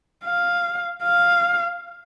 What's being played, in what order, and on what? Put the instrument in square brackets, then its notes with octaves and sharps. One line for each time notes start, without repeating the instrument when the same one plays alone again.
[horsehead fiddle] F5
F5